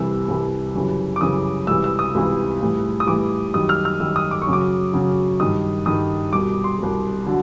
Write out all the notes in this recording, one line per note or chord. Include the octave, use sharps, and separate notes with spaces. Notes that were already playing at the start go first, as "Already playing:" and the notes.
Already playing: C2 C3 E3 G3 E6
C2 C3 E3 G3
F#2 C#3 E3 G3
D6
F#2 C#3 E3 G3 D#6
C#2 C3 E3 G3 E6
E6
D#6
C#2 C3 E3 G3
A2 E3 G3
D#6
A2 E3 G3 D6
F#2 D#3 G3 D#6
F6
F6
F#2 D#3 G3 E6
D#6
D6
C#6
F#2 C#3 F#3
D6
F#2 C#3 F#3
G2 D#3 G3 D#6
G2 D#3 G3 D#6
C2 B2 G3 D6
C6
C2 B2 G3
D3 F#3